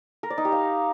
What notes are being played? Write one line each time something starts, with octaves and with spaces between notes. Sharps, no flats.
A#4
D5
D#4
G4
F5